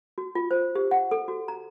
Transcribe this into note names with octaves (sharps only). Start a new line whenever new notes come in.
F#4
F4
C5
G4
F#5
A4
F#4
A#5